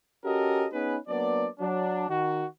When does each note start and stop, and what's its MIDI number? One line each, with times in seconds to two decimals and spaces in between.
0.24 0.67 61
0.24 0.67 66
0.24 0.67 67
0.24 0.67 69
0.24 0.67 70
0.24 0.67 75
0.72 0.96 59
0.72 0.96 61
0.72 0.96 63
0.72 0.96 68
0.72 0.96 71
1.07 1.47 54
1.07 1.47 58
1.07 1.47 59
1.07 1.47 62
1.07 1.47 74
1.59 2.06 54
1.59 2.06 62
2.08 2.45 51
2.08 2.45 66